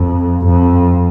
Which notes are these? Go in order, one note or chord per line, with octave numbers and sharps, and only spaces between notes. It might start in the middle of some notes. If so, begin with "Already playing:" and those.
Already playing: F2
F2